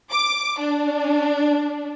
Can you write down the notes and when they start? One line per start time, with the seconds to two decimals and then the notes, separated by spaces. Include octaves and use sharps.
0.11 D6
0.60 D4